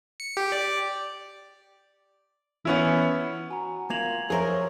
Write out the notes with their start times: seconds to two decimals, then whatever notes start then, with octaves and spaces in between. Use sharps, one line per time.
0.20 C#7
0.37 G4
0.52 D5
2.65 E3 B3 C#4 E4
3.51 F#4 G#5 A#5
3.90 A#3 F4 G#6 F7 F#7
4.30 F3 G#4 A#4 C5 C#5 E5